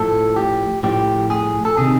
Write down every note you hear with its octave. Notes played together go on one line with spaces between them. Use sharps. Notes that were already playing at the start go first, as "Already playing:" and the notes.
Already playing: A2 F3 A4
G4
A2 F3 G4
G#4
A4
C3 D#3 G#4